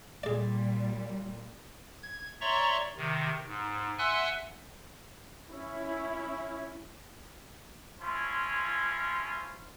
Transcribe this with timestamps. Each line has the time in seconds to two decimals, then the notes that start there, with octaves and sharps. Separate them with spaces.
0.23 A#2 G3 G#4 D5
2.03 G#6
2.41 C#5 D5 E5 A#5 C6 C#6
2.97 C3 D#3
3.47 G#2
3.98 E5 F#5 G#5 C6 E6 F#6
5.50 C#4 E4
8.01 F3 C#4 E4 F4